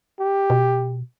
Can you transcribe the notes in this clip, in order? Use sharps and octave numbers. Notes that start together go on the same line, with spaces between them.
G4
B2